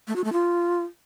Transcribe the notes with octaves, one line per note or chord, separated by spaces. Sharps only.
A3
F#4
A3
F4